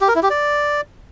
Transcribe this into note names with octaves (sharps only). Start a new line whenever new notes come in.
G4
A#4
E4
G4
D5